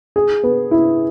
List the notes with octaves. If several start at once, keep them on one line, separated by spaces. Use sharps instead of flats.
G#4
B3
E4